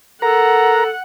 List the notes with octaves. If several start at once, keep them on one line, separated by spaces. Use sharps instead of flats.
A4 A#4 F#5 A#5